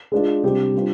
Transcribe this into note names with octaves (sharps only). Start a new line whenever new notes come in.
G#3 D4 F4
C3 G3 D4 G4 C5
G3 D4 F4 C5